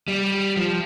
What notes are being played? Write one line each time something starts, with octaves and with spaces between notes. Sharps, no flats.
G3
F3